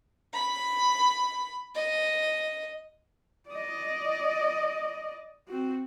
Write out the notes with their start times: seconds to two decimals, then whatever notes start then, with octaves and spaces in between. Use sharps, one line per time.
0.33 B5
1.75 D#5
3.49 D5 D#5
5.48 C4 F#4